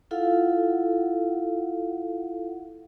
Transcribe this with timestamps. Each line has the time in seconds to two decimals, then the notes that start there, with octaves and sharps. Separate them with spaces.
0.11 E4 F4 A4 F5 F#5